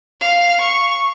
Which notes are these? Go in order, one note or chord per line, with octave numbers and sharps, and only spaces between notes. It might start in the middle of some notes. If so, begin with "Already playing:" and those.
F5
C#6